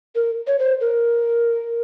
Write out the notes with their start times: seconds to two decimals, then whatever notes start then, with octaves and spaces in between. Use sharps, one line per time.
0.15 A#4
0.47 C#5
0.59 C5
0.81 A#4